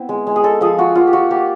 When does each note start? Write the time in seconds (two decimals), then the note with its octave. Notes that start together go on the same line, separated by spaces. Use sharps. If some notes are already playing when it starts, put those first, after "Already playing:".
Already playing: B3 C4 E4
0.09 G#3
0.27 G#3
0.36 G#4
0.44 G#3 A4
0.61 F3 G#4
0.78 F4 F#4
0.95 A#3 F4
1.07 G4
1.13 F4 F#4
1.31 A#3 G4